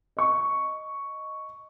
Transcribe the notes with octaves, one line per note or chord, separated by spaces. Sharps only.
D#5 C#6